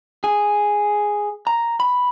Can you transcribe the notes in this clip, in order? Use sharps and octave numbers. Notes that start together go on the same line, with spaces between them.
G#4
A#5
B5